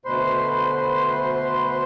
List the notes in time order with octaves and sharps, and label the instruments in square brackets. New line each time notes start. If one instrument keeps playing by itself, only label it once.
[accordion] D2 B2 B4 C5 C6